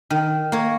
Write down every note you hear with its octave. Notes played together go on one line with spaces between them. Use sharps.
D#3
A#3 C#5